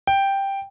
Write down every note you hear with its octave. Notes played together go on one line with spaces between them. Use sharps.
G5